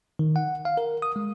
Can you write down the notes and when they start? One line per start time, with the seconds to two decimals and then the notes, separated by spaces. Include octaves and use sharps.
0.19 D#3
0.36 F#5
0.65 F5
0.77 A#4
1.02 D#6
1.16 G#3